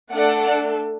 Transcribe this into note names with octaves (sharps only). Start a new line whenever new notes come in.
A3 D4 A4 D5 F#5